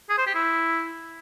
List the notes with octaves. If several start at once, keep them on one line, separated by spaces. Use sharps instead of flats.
G#4
C5
G4
E4